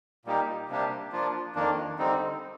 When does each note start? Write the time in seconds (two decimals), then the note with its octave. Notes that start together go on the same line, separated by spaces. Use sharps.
0.25 A#2 G3 A#3 D#4 G4
0.68 C3 G3 A#3 D4 G4
1.12 F3 A#3 D4 F4
1.55 F2 D#3 A#3 D4
1.98 D3 G3 C4 D#4